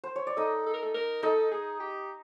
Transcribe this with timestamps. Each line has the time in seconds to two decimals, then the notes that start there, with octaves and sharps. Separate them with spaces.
0.04 C5
0.16 C#5
0.27 D5
0.37 D#4 A4 D#5
0.66 A4
0.74 A#4
0.82 A4
0.94 A#4
1.23 D#4 A4 D#5
1.51 G#4
1.80 G4